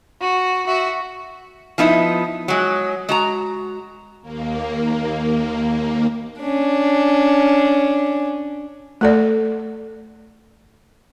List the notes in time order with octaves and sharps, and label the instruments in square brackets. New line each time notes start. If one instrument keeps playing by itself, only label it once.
[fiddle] F#4
F#4 E5
[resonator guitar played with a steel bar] F3 B3 D#4 E4
F#3 G#3
G#3 F#4 A#5
[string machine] D#2 A#3
[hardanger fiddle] C#4 D4
[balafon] A3 A4 D5